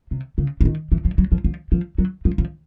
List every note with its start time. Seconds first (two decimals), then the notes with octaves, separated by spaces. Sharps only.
0.11 C3
0.38 C#3
0.61 E3
0.65 D#3
0.92 E3
1.05 F3
1.18 F#3
1.32 F3
1.44 F3
1.72 F3
1.98 F#3
2.25 F3
2.38 F3